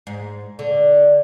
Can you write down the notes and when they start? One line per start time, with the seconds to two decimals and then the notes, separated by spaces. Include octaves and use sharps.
0.07 G#2
0.59 D3